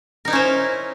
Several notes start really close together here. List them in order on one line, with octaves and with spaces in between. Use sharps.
A#4 D#4 E4 C#4 C5